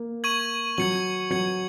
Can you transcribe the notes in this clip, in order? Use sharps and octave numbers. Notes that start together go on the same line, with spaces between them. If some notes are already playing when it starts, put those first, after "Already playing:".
Already playing: A#3
C#6 G#6 D#7 F#7
F#3 G#6 C#7 F#7
F#3 G#6 C#7 F#7